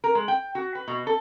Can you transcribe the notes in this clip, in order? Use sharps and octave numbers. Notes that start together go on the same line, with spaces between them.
A#4
G#3
G5
F#4
B4
B2
A4